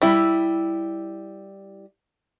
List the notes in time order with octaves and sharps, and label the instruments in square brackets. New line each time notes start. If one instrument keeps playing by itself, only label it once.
[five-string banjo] G3 E4